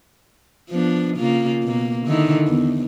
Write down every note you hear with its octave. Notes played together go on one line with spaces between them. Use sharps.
F3 B3 D4
C#3 A#3 F4
B2 A#3
D3 D#3 E4
E2